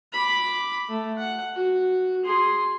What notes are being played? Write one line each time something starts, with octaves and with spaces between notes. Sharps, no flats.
B5 D6
A3
F#5
F#4
G#4 C6